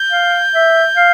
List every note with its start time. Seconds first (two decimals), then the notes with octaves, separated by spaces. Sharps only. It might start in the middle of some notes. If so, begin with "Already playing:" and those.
Already playing: G6
0.11 F5
0.54 E5
0.97 F5